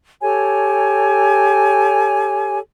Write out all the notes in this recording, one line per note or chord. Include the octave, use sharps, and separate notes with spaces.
G4 A4 C#5 G#5